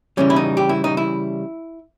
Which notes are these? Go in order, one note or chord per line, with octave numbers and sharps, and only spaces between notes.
C#3 E3 G3 C#4
E4
D#4
G4
E4
D#4
E4